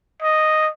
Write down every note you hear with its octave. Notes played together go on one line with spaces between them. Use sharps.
D#5